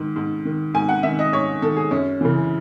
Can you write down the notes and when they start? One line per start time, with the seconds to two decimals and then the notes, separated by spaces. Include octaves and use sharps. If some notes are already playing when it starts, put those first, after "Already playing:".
Already playing: G#2 D#3
0.16 G#2
0.45 D#3
0.74 G#2 G#5
0.89 F#5
1.03 D#3 E5
1.19 D#5
1.33 G#2 C#5
1.62 D#3 A4
1.76 G#4
1.91 F#2 C#4
2.21 C#3 E3